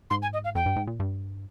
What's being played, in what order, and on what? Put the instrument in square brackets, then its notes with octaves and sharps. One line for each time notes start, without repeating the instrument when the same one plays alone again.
[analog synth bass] G#2 [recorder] C6
[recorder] G#5
D#5
F5
[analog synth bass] F2 [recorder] G5
[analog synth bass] G2
G#2
A#2
G2